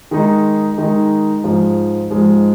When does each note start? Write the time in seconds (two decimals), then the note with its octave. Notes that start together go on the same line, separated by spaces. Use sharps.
0.11 D#3 G#3 D#4
0.78 D#3 G#3 D#4
1.44 G#2 F3 G#3
2.11 G#2 F3 G#3